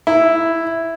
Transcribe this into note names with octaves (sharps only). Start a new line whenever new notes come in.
E4